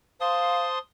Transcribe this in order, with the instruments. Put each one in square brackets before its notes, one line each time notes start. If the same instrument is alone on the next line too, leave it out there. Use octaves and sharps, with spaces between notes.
[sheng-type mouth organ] C5 A5 [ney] F5 [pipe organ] C6 D#6